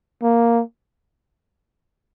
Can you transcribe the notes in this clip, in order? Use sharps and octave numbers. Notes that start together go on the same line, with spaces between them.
A#3